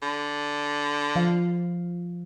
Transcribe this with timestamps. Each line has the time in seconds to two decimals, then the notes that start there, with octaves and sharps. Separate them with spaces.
0.02 D3
1.16 F3 F5